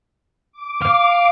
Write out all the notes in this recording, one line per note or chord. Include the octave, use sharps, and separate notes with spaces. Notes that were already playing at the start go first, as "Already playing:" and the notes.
D6
F5